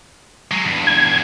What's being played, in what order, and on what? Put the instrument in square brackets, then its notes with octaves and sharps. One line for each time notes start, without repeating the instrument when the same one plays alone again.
[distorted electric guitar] F#3 G#3
E2 G2
[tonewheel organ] G#6